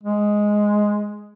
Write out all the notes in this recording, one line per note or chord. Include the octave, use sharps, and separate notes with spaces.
G#3